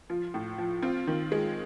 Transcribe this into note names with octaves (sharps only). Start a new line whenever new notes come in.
F3 F4
A2
F3
C4 F4
D#3
G#3